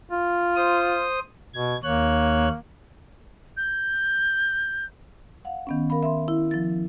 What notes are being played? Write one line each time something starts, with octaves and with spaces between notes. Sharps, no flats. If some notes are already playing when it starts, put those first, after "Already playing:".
F4
C5 D#6
B2 G#6
D#2 A#3 C#5 F#6
G6
F5 F#5
D#3 B3 C#4
A#4 F5 B5
E5 C6
E4
F3 A6